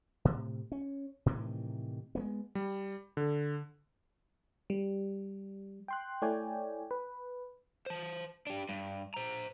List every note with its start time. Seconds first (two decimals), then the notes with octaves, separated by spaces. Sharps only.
0.25 A2 C3
0.72 C#4
1.26 A2 C3 D#3 E3
2.15 G#3 A#3 B3
2.55 G3
3.17 D3
4.70 G3
5.88 G5 C6 F#6
6.22 A3 E4 C#5 D5 G5 G#5
6.91 B4
7.86 C5 A5
8.47 D4 G4
8.69 G2
9.14 C5 A#5